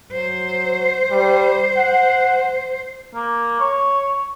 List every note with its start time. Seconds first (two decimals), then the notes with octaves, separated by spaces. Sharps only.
0.13 F#3 C5
1.11 G3
1.77 F#5
3.15 A#3
3.60 C#5